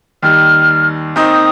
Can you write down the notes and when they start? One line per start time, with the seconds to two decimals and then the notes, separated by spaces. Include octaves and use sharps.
0.23 D#2 D#3 G3 F6
1.16 D#2 D#3 C4 D#4 D#6